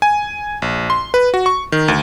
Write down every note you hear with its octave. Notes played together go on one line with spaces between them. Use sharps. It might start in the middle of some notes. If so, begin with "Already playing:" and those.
G#5
A#1
C6
B4
F#4
C#6
D#3
D2